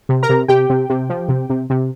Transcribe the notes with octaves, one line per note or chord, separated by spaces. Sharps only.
C3
A#4 A#5
C3
C3 G4 G5
C3
C3
F3
C3
C3
C3